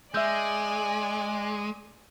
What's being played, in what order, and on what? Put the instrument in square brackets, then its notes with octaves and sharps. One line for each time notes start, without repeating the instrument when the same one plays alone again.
[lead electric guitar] G#3 [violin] D5 G#5 [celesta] E5 E6 G6